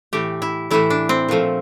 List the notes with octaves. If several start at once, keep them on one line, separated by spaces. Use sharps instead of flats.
A2 E3 A3 G4
E4
A2 E3 A3 E4
D4
C4
A#2 F3 A3